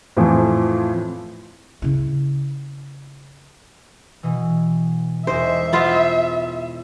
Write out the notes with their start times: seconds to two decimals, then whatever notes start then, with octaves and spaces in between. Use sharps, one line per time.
0.17 F2 A2 E3 F3 C4
1.82 C#3 E4
4.23 B2 E3
5.27 E1 D#4 C5 E5
5.73 B3 F4 C5